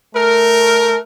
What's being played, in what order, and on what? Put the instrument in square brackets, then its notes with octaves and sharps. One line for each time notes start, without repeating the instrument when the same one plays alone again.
[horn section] A3 A#4